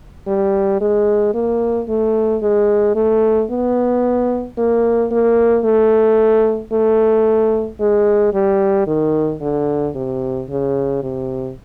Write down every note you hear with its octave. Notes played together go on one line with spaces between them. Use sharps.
G3
G#3
A#3
A3
G#3
A3
B3
A#3
A#3
A3
A3
G#3
G3
D#3
D3
C3
C#3
C3